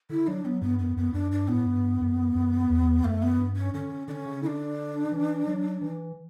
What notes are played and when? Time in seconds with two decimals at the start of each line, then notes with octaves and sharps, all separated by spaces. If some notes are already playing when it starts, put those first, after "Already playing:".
0.09 D3 E4
0.27 F#3 D4
0.44 F#3 B3
0.61 G2 B3
0.79 F#2 B3
0.96 F#2 B3
1.13 F#2 D4
1.31 G2 D4
1.48 A2 B3
1.66 G2
2.00 F#2
2.35 F#2
2.69 E2
3.04 F#2 A3
3.22 B3
3.38 G2
3.56 C#4
3.74 D3 C#4
4.08 D3 D4
4.11 C#4
4.25 C#3
4.43 D3 E4
4.47 D4
5.12 E3
5.47 F#3
5.81 E3